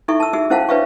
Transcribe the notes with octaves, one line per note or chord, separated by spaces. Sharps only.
D#4 E4 A4 E5 C#6
A5 E6
D#4 F#4 G#4 E5 E6
C#4 E4 C5 F5 F#5 A5
D4 B4 C#5 E5 F5 C#6